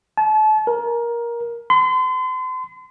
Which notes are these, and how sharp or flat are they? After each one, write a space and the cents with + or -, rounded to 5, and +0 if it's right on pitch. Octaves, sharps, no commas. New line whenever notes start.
A5 -35
A#4 +15
C6 -40